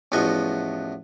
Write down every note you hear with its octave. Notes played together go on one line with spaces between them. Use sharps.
A1 E2 F3 F#4 D#5 C#6